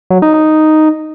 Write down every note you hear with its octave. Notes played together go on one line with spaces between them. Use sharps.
F#3
D#4
D#4